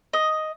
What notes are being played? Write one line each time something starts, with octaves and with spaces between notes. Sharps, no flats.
D#5